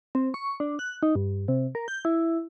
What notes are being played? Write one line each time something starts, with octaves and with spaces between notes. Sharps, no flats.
C4
C#6
D4
F#6
D#4
G2
C3
A#4
G6
E4